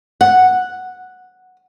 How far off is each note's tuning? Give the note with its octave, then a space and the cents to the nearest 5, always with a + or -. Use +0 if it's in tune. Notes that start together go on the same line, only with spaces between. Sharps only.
F#5 -5